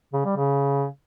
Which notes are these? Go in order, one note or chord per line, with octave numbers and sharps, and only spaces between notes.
C#3
G3
C#3